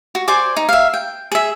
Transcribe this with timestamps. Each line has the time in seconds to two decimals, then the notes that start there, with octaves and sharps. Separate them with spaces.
0.15 F#4
0.28 C5 D5 G#5 D6
0.56 D#4
0.69 E5 F5
0.94 G5
1.32 G#4 E5